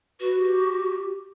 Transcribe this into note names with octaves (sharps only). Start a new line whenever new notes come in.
F#4 B4
G4